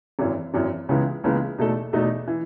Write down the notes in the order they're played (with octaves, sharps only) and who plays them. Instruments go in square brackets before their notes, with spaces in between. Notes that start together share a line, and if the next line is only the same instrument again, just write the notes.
[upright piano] G#1 F#2 E3
G#1 F#2 E3
C#2 C#3 E3 G#3 B3
C#2 C#3 E3 G#3 B3
E2 B2 A3 D#4 A4
E2 B2 A3 D#4 A4
E3